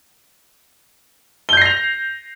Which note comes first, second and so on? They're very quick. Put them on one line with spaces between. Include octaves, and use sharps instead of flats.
G7 G6 C7 A#6 F7